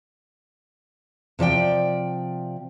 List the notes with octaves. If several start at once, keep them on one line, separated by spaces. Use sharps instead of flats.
C3 F3 D5 G5